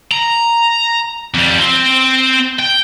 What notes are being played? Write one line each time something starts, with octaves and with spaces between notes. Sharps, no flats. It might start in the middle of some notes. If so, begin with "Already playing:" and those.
A#5
F2 G3
C4 C5
G5